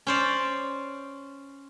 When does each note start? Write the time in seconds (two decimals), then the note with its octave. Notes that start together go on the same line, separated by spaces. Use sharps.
0.07 C#4 C5 D5